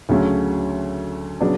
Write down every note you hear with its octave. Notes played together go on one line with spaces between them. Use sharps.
D2 C#3 F#3 A3 C#4
C#3 F#3 B3 D4